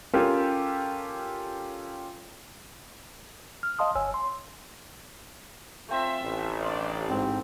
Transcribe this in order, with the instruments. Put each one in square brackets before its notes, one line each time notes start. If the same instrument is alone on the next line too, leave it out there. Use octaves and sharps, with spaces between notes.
[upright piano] C#4 F4 G4 A4 A#4
[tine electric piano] F6
D#5 F5 A5 C6 D#6
G1 C#5 G#5 E6
C6
[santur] A3 C4 [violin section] F4 E5
[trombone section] A1
[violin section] D4 G4 D5 [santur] C6
[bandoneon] G#2 C4